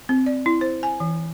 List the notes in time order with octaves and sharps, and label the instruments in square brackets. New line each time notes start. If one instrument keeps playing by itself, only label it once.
[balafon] C4
D5
E4
C5
G#5
E3